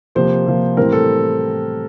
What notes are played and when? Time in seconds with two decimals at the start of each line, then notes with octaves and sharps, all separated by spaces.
0.15 C3 F3 A#3 C5
0.47 C3 F3 A#3
0.77 A2 E3 G3 C4 A#4
0.92 A4